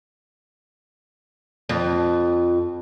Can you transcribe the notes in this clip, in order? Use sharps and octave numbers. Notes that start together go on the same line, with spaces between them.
F2